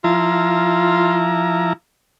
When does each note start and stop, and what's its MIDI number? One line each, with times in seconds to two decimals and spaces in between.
0.04 1.73 53
0.04 1.73 64
0.04 1.35 65
0.04 1.73 82